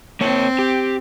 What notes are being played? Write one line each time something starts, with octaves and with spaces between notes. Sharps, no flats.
A#3 C4 C#5
G4